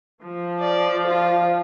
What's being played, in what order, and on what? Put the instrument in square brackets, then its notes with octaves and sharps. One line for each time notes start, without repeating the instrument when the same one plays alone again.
[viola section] F3
[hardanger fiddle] D5
F4